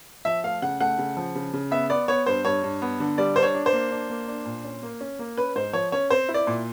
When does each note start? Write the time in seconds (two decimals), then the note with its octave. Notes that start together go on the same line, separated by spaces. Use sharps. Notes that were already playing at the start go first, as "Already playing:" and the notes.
0.25 F3 E5
0.44 A3 F5
0.62 C#3 F#5
0.80 A3 F#5
0.98 C#3
1.17 F3
1.35 C#3
1.53 C#3
1.71 B3 E5
1.90 B3 D5
2.08 B3 C#5
2.26 G2 C5
2.45 G2 C#5
2.63 G2
2.82 B3
3.00 D3
3.18 G3 D5
3.36 D4 C5
3.43 C#5
3.54 D4
3.66 C5
3.73 A#3
3.91 D4
4.10 A#3
4.28 D4
4.46 A#2
4.64 C#4
4.83 A#3
5.01 C#4
5.19 A#3
5.37 C#4 B4
5.55 G#2 C5
5.73 F3 C#5
5.92 C#4 C#5
6.10 C4 C5
6.29 E4
6.34 D5
6.47 A#2